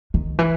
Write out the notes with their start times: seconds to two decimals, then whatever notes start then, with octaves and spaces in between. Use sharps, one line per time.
0.14 D#3
0.39 E3